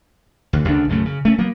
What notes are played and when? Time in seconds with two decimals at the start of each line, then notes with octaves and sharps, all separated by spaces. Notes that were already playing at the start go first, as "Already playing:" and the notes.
0.53 D2
0.65 D2 C#3 D4
0.89 B1 F#2 C#3 A3
1.06 C#3
1.25 A3 C#4
1.38 F#3 A#3 B3